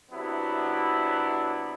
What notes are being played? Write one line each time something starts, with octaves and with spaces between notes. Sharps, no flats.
C3 F#3 B3 D4 E4